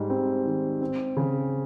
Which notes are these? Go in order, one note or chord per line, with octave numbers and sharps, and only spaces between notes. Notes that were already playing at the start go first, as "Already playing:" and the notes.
Already playing: G#2 G3
C4
D#3
C4
C#3